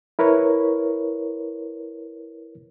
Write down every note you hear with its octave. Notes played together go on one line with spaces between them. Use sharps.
E4 A#4 B4 C#5